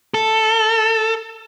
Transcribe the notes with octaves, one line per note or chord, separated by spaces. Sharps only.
A4